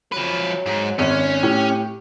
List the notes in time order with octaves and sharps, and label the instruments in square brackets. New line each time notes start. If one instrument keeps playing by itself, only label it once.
[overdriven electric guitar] F3 B4 [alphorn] F#3
[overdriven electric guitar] G#2
[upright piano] G#1 [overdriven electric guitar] C#4
[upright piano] A2 [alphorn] G4